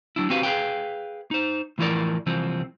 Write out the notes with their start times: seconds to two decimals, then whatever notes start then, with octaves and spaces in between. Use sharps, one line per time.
0.16 F#3 D4 E4
0.30 C4 F#4 G4 B4 F5
0.43 G#4 B4 F5 G5
1.31 D#4 C5
1.78 A2 E3 F3 E4 A#4 D5
2.26 C2 E3 F3 C4